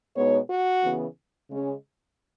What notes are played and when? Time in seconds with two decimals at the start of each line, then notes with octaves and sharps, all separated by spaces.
0.16 B2 G#3 B3 D#4 C#5
0.49 F#4
0.82 C#3 E3 B3
1.49 C#3 G#3 C#4